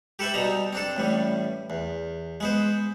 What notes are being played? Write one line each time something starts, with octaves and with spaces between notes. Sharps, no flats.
G4 A4 B4 C5 E5
B2 G3 D#4 A#5
C4 D4 A4
A1 A2 G3
E2
G#3 B3 C5